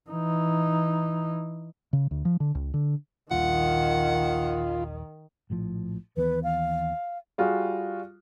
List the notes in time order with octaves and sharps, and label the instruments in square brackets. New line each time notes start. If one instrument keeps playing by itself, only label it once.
[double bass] E3 D#4
[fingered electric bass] C#3
D2
F3
D3
C#2
D3
[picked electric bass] D#1 A#1 [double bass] D#3 [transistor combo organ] F4 [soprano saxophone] F#5
[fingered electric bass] A#1 A2 F3
[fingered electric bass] D#2 E3 B3 [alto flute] B4
[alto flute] F5
[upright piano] G3 F4 F#4 G#4